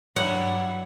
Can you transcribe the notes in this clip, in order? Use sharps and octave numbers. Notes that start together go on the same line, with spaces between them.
G2 F#3 G3 E4 D5 F#5